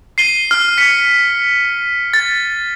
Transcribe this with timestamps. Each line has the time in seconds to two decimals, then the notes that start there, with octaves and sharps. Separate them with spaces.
0.18 C7 D#7 G7
0.51 F6
0.78 B6 C#7
2.14 A6